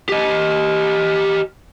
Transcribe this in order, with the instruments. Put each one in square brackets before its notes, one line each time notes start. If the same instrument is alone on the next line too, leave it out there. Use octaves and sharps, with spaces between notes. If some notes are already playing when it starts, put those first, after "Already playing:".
[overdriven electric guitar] G4 D#5